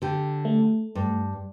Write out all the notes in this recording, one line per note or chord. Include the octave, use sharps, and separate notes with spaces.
D3 G4
A3
G2